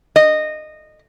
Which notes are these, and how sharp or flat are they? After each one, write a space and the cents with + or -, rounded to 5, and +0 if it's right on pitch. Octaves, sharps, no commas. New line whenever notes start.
D#5 -15